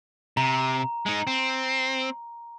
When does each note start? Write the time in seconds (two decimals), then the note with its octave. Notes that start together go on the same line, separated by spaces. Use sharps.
0.37 C3 A#5
1.06 G#3 D#4
1.27 C4